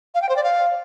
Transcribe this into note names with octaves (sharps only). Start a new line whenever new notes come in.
F5
G5
C5
D5
F5